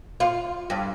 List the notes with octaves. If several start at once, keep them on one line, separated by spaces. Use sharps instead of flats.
F4
G2